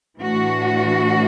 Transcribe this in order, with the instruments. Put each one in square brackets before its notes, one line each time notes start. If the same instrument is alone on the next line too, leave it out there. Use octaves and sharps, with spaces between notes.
[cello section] A2 E3 A3 D4 F#4